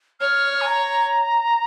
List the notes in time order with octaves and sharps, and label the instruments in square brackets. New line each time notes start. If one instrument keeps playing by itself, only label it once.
[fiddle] C#5 [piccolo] F6
[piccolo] G#5
A#5